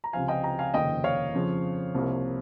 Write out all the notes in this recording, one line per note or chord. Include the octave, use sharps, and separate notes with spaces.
A#5
C#2 C3 F3 F5 G#5
D#5 G5
G5 A#5
F5 G#5
F1 D#2 C#3 F3 A#3 D#5 G5
C#5 F5
F2 C#3 F3
C2 C3 F3 A#3